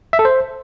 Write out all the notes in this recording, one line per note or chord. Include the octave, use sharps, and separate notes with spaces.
E5
A4
C5